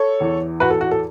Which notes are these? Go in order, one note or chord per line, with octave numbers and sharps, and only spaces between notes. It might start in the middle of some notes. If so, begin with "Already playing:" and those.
Already playing: A4 C#5
E2 E3
F#4 B4
A4
F#4
A4